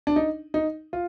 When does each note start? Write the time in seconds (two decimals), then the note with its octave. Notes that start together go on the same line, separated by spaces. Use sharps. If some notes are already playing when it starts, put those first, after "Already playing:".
0.07 D4
0.16 D#4
0.54 D#4
0.93 F4